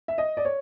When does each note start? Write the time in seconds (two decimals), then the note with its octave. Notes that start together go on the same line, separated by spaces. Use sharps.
0.08 E5
0.18 D#5
0.37 D5
0.45 C#5